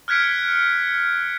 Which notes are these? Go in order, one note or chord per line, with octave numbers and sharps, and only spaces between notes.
F6 F#6 G#6 B6 C#7 D7